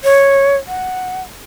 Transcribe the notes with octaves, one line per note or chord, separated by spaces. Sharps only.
C#5
F#5